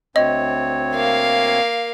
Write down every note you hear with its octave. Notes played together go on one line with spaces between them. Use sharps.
D2 C4 C#5 D#5
A#3 F5